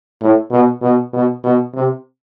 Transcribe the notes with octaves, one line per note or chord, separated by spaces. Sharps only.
A2
B2
B2
B2
B2
C3